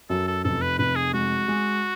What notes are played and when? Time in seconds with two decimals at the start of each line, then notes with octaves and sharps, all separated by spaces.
0.10 F#2 A4
0.27 A4
0.45 F1 A4
0.62 B4
0.79 F1 B4
0.96 G#4
1.14 G#3 F#4
1.48 G#3